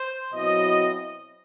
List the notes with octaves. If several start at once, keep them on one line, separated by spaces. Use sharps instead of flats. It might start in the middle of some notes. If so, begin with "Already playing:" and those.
Already playing: C5
B2 F#3 C4 E4 D#5